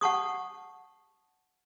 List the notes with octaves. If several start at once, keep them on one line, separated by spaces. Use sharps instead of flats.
F#5 A5 C#6 D#6